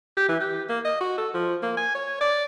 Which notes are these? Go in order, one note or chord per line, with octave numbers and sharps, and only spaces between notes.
G4
E3
G4
A#3
D#5
F#4
A4
F3
A#3
G#5
C#5
D5